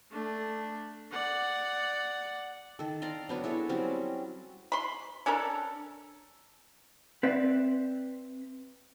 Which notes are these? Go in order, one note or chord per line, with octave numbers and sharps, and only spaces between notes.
A3 D4
D5 F#5
D#3 A4
D5 F5 A#5 C6
F#3 B3 D4
E4 G#4 A4 C#5
F#3 G3 C4 C#4
B5 C6
C#4 D4 A4 A#4
C4 B4 D5 E5